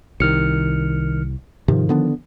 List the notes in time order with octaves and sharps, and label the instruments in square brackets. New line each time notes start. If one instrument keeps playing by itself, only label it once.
[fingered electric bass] C2 [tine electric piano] D#3 F6 C#7
[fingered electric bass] G#2 C3 [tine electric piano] D#3 F3
[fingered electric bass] D3 B3 D4